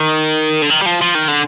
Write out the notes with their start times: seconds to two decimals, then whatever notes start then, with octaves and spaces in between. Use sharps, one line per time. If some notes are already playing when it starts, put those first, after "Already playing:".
Already playing: D#3
0.62 D3
0.70 D#3
0.82 G3
0.86 F3
1.01 F3
1.15 D#3
1.28 D3